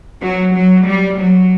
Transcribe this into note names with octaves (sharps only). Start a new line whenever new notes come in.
F#3
F#3
G3
F#3